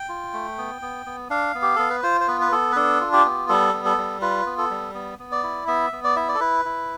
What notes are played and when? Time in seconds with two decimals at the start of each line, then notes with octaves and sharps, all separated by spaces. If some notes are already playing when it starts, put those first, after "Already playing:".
Already playing: G5
0.09 F4
0.33 A3
0.58 B3
0.82 B3
1.06 B3
1.30 D4 F5
1.55 B3
1.62 G4
1.76 B3 A4
1.90 B4
2.03 F4 C5
2.21 C5
2.28 B3 B4
2.41 B4
2.52 B3 A4
2.72 B4
2.76 D4 A4
3.01 F4
3.13 G4
3.25 B3
3.49 G3 A4
3.73 B3
3.85 A4
3.98 G3
4.21 F4 B4
4.46 B3
4.58 A4
4.71 G3
4.94 B3
5.19 B3
5.32 D5
5.43 E4
5.67 B3 E5
5.92 B3
6.04 D5
6.16 E4 E5
6.28 D5
6.34 A4
6.40 E4 B4
6.65 E4